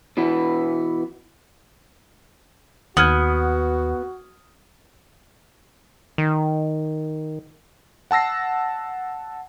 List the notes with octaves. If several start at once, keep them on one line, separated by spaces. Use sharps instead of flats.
B2 E3 B3
D#2 B3 F#4 D#6 F6 G#6
D#3
F#5 A5 E6 A#6 C7